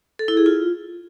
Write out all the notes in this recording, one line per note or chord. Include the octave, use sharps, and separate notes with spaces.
A4
E4
G#4
F4